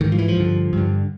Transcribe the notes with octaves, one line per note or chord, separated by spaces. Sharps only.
G#2 D#3
F3
E3
F3
G2 D3
G2 D3